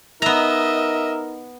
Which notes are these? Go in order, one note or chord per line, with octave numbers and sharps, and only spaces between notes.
B3 D#4 A#4 D#5 E5 A#5